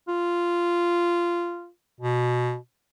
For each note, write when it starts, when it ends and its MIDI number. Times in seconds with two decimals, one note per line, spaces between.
0.08 1.69 65
2.00 2.56 47